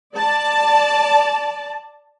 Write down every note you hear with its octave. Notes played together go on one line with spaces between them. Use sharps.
D5 A5